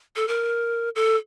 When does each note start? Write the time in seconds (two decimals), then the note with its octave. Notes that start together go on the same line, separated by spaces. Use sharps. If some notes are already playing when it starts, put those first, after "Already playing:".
0.16 A4
0.28 A#4
0.96 A4